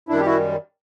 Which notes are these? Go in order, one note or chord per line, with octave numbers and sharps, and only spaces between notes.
F#2 D#3 G3 D4 E4
G4
E4 F#4